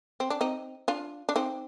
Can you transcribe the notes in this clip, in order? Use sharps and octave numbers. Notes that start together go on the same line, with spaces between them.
C4
D4
C4 D#4
D4 F4
D4
C4 D#4